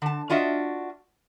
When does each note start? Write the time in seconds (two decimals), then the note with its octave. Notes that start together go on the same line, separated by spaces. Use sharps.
0.02 D3 A5
0.30 D4 F4 F#4 D#5 E5